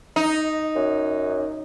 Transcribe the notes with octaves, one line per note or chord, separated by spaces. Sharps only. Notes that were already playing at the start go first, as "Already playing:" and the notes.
D#4
F#2